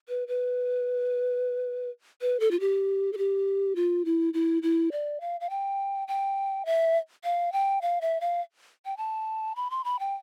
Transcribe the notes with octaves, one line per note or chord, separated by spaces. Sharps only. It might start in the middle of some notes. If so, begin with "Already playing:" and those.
B4
B4
B4
A4
F4
G4
A4
G4
F4
E4
E4
E4
D5
F5
F5
G5
G5
E5
F5
G5
F5
E5
F5
G5
A5
B5
C6
B5
G5